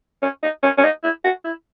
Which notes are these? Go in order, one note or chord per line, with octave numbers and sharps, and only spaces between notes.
C#4
D#4
C#4
C#4
D#4
E4
F#4
E4